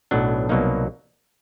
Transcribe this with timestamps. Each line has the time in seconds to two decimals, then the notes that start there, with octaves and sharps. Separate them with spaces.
0.11 B1 A2 F#3 B3 D4
0.49 C2 B2 F#3 A#3 D#4